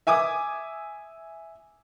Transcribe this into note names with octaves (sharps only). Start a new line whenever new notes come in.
E5 G#5 D6 D#6